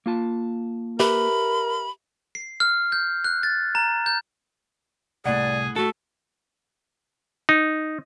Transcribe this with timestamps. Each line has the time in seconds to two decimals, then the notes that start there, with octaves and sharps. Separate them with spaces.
0.06 A#3 F4 A5
1.00 G4 A#4 B4 E5 B5
2.35 C7
2.60 F6
2.92 G6
3.24 F#6
3.43 A6
3.75 A#5
4.06 G6
5.26 C2 A2 G#4 D5 F#5
5.76 A3 F#4 A4
7.49 D#4